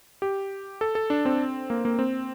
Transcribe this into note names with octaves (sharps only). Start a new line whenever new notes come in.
G4
A4
A4
D4
C4
A#3
A#3
C4